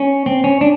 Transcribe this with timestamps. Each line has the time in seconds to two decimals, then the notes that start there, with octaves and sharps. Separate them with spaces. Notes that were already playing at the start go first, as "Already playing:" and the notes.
Already playing: C#4
0.26 C4
0.44 C#4
0.61 D4